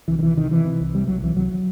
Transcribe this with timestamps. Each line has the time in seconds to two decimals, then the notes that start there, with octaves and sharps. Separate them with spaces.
0.08 C2 E3
0.19 D#3
0.22 C2 E3
0.37 C3 D#3
0.51 C3 E3
0.65 C3
0.80 C2
0.94 C3 G3
1.08 C2 F#3
1.23 C2 E3
1.36 C2 F#3